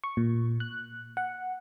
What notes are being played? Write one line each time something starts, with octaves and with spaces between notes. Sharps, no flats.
C#6
A#2
F#6
F#5